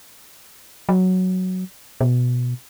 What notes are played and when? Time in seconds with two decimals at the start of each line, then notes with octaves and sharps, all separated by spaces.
0.89 F#3
2.01 B2